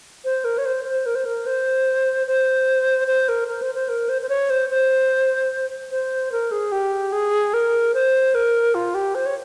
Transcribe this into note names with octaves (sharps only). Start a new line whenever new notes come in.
C5
A#4
C#5
C5
C5
A#4
C5
A#4
C5
C5
C5
A#4
A#4
C5
C5
A#4
C5
C5
C#5
C5
C5
C5
A#4
G#4
G4
G#4
A#4
C5
A#4
F4
G4
C5
C#5